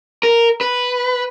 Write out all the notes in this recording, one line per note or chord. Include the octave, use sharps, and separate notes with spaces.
A#4
B4